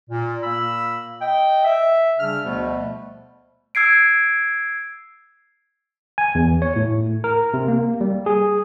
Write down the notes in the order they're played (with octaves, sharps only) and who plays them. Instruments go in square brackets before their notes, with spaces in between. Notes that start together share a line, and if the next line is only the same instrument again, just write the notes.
[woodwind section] A#2
A#2 A#3 B5 E6
D#5 G5
E5
C#3 G3 D4 F6
D2 B2 F3 G3 A3 B3
[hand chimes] E6 G#6 C7 D7
[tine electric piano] G#5
E2
C#5
A2
A#4
C3
A#3
G3
G#4